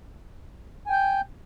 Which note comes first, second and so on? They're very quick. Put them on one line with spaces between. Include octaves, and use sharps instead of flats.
G#5 G5 G6